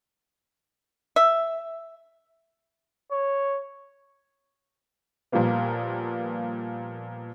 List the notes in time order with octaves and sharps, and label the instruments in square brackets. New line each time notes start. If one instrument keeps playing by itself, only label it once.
[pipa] E5
[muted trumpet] C#5
[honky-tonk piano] A#2 F3 G3 A#3 B3